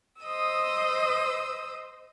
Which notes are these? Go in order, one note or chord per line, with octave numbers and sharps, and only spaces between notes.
C5 D#5 D#6 E6